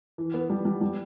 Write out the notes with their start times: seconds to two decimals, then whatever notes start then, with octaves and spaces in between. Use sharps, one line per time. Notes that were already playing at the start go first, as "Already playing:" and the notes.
0.18 E3
0.34 B3
0.50 G3
0.65 G3
0.81 G3